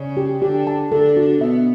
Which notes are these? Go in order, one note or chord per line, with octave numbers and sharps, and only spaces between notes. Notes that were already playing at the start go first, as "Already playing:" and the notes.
Already playing: C#3 C#4 D5
G4
D3 D4 G4
A5
D3 D4 A4
F#4
B2 B3 E5